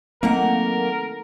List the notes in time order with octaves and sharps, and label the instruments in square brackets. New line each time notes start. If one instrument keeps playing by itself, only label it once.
[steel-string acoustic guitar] D#3 A3 F#5 [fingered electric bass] F#3 C4 [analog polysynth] A#3 [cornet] A#4